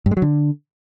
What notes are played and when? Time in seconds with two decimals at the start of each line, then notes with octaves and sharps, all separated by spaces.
0.06 G2
0.11 G#3
0.17 F#3
0.22 D3